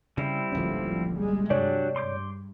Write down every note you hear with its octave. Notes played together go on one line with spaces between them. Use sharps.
C#3 G3 C4 E4
D1 A#1 D3 F3 C#4
G3 G#3
G2 C3 F#3 D4 G4 C#5 D5
G2 C6 D6 G6